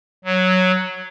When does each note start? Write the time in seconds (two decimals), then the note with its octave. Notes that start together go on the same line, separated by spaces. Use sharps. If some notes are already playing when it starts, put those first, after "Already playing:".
0.25 F#3